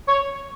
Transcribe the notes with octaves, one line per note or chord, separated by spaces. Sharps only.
C#5